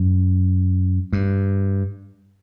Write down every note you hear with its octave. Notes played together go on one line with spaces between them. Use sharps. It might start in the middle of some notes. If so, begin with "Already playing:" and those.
Already playing: F#2
G2